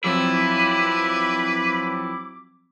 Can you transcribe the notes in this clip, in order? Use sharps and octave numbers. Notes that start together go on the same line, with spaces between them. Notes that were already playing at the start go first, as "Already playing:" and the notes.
F3 F#3 C4 E4 B4 D6